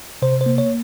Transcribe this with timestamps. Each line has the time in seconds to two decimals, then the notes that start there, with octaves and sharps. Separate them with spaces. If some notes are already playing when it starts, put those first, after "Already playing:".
0.22 C3 C5
0.41 C5
0.46 A#3
0.58 C#5